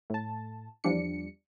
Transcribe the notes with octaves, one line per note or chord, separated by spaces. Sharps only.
A2 A5
E2 F3 G3 D4 C#7